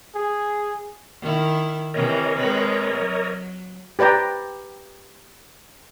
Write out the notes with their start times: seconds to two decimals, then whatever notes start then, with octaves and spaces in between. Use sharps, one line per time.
0.15 G#4
1.21 D#3 E4
1.94 C3 E3 A#4 C#5 D#5
2.38 G#3 C4 B4
2.94 F#3
3.99 G4 B4 D5 G5 A#5